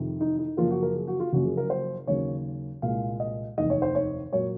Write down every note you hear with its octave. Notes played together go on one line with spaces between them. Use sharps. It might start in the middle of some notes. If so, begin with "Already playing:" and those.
Already playing: F2 C3 D#3
D#4
D#4
F#2 C#3 F3 A#3 F4
F#4
A#4
G#4
F#4
F4
F#1 F#2 F3 A#3 F#4
G#4
A#4
C5
D#2 C#3 F#3 A#3 C#5
C2 A#2 G#3 F5
D#5
F1 D#2 D#3 D#5
C#5
C5
C#5
A#2 F#3 A#3 C#5